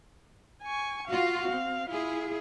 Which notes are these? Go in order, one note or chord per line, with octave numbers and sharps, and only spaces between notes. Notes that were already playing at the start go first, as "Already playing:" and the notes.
G#5 C#6
F4 F#4 F5
C4
E4 F4 G#4